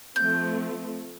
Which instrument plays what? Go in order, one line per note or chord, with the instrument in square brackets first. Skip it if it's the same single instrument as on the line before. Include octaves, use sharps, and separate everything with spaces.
[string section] F3 A3 C4 [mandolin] G6